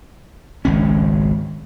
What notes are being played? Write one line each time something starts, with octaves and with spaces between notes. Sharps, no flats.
G#1 C#2 C#4